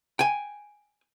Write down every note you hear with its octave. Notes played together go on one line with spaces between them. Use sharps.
G5 G#5